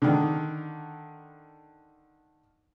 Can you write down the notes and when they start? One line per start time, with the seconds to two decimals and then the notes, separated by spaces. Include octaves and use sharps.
0.02 D3 D#3